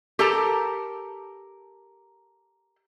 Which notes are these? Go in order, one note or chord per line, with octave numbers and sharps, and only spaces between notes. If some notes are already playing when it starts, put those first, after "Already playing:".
G4 A4 A#4 A5 A#5